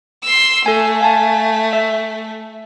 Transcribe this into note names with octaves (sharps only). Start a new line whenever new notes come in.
C6 E6
A3 A4 G#5
F5 G#5 A5
E5